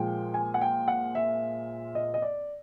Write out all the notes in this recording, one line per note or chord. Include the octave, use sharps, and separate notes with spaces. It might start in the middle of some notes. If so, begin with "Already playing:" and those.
Already playing: A#2 F3 G#3 G5
G#5
F#5
G5
F#5
E5
D#5
D#5
D5